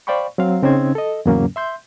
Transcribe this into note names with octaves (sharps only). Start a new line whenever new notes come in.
C5 D5 F5 G5 B5 C#6
F#3 C4 F5
C#3 C4 C#4 D#4 C5 G#6
A4 D#5
E2 G#2 C#3 F#3 A#3 C#4
E5 C6 G6